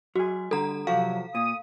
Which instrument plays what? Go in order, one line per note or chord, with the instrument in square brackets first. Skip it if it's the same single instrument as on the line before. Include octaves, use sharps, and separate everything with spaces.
[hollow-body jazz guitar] F#3 G#4 [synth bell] F#4
[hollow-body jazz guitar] D3 G3 [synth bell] A4 A#5
[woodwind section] C3 F#3 [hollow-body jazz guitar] F3 F#4 [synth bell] F5
[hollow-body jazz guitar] A#2 [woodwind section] D#6